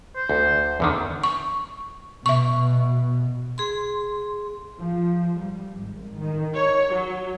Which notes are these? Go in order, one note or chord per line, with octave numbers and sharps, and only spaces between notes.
C5
D2
E2 D3 D#3
C#6
B2 E5 C#6
G#4 C6
F3
G3
G#1
D#3
C#5
F#3